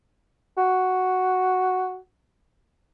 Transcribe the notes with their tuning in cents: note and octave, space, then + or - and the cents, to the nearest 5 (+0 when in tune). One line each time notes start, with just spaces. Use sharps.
F#4 +0